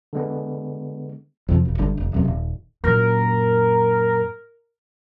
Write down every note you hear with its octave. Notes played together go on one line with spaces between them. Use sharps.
D3 G#3 B3
F2 C3 F3
E1
G1 G2 D3
F1
D1 F#2 C3
D#1
F#2 A#2 A#4